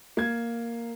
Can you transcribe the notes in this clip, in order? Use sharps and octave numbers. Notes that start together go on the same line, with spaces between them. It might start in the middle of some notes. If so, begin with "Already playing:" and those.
A#3 G#6